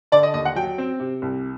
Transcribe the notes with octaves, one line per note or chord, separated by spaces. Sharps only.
D3 D5
D#5
D#2 D#5
F#5
F#3 G5
C4
C3
C2